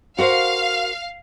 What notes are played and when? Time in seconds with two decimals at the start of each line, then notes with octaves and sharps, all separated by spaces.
0.18 F#4 A#4 C5 F5